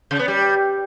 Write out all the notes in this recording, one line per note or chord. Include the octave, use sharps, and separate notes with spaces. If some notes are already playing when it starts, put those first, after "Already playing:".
C#3
B3
G3